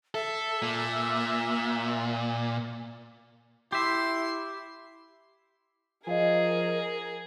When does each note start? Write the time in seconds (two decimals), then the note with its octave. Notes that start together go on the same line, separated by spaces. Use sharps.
0.14 A4 E5
0.62 A#2
3.72 E4 G4 E5 C6
6.07 F3 G#4 A#4 D#5 F5 G#5